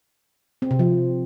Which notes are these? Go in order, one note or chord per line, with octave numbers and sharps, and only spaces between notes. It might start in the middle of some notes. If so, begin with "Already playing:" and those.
C4
C3
F3